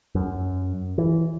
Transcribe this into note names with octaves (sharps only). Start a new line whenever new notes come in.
F#2
E3